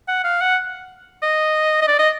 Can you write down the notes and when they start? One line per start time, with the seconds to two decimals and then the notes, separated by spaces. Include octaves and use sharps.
0.08 F#5
0.24 F5
0.41 F#5
1.23 D#5
1.82 D#5
1.88 D5
1.99 D#5